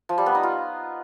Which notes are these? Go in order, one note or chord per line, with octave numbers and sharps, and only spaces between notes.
F3
G3
B3
D#4
F4